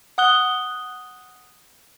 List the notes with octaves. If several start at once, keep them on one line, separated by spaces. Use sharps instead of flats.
F#5 D#6 F#6 G7